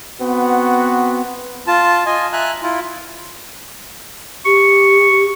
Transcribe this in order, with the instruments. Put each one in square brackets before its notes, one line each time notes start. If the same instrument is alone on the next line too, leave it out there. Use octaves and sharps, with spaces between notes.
[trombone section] B3 C4 F#4
[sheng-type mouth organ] F4 A5
F4 D#5 G#5
E5 G#5 A#5 F#6
E4 F4
[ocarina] G4 [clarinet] C#6